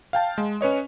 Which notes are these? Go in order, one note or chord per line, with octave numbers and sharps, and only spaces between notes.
F5 G5 A5
G#3
C#4 B4 C#5 D#5